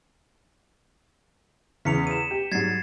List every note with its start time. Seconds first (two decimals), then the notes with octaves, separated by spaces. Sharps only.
1.85 E2 C#3 B6 C#7 F7
2.07 D#7 E7
2.31 G4
2.52 G#2 F#3 G3 G#6 A6 C7